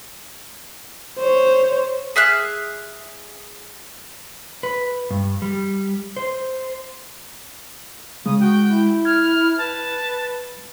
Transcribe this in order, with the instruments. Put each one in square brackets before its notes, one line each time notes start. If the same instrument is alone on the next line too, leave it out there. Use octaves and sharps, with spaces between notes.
[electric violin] C5 C#5
[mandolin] G#4 E5 F6 F#6
[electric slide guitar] B4
G2
G3
C5
[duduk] C#3 [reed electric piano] G#3 [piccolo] D#6
[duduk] F#4 [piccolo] G5
[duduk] E4
[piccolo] F6 [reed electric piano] G#6
[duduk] B4 [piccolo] A5